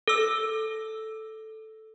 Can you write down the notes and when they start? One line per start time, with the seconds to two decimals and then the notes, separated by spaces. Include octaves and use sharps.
0.08 A4 E6